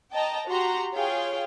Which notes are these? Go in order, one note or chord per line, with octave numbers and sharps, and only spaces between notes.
D#5 G5 A5 A#5
F#4 G4 A#5 C6
F4 G#4 C#5 F5 G5